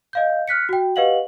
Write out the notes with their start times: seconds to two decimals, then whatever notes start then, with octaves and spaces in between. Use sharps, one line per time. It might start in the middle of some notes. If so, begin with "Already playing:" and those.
0.13 D#5 F5 G6
0.48 F6 F#6 B6 C#7
0.69 F#4 G5
0.96 G4 B4 D#5 F5 F#5 F#7